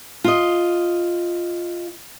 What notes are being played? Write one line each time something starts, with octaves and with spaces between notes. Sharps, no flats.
F4 D#5